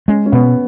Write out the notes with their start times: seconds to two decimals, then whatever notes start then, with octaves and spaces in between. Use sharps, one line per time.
0.08 G#3 C#4
0.26 C#4
0.32 B2 B3